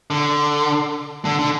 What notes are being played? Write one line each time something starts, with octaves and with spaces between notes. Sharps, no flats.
D3
D3
D3